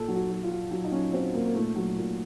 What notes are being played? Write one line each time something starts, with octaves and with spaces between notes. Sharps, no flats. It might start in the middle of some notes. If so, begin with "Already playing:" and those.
Already playing: A#2 A4
F#3
F#4
F#3
F4
F#3
F#3
D#4
F#3 C#4
F#3 C4
A#2 A#3
A#3
A#2 A3
F#3
A#2